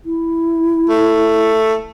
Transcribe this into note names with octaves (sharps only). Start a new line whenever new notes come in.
E4
A3